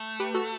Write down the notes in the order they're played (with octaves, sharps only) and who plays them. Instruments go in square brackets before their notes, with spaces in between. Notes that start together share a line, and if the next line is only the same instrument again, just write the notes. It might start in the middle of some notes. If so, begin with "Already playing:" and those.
Already playing: [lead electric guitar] A3
[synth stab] G4 B4
F#4 A4